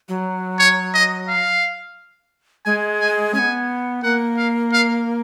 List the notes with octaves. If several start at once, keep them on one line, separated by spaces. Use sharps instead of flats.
F#3
C#5
D#5
F5
G#3 G#5
G#5
B3 C#4 G#5
A#3 F#5
F5
F5